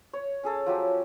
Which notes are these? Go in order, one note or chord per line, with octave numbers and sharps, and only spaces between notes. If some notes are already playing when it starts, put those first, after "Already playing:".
C#5
C#4 G#4 A4
F3 F#3 G4